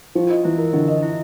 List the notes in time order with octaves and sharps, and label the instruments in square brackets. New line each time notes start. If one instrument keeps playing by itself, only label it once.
[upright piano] F3 [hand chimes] G4
[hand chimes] D#5
[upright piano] E3 [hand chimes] E4
[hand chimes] A#4
[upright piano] D3 [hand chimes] G4
[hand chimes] D#5
E4